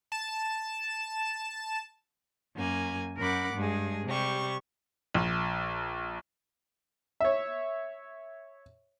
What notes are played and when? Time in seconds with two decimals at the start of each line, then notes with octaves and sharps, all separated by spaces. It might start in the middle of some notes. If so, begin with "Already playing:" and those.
0.12 A5 E7
2.55 F#2 A#3 G#5
3.18 F#2 A#4 F#5 B5 D6
3.55 G2 G#3 G#4
4.06 C3 G3 C#6
5.14 A#1
7.20 C#5 E5